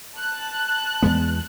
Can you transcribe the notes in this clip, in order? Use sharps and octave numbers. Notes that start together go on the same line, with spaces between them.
A5 F#6
E2 G#3 B3